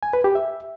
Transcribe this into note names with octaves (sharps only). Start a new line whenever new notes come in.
G#5
B4
G4
E5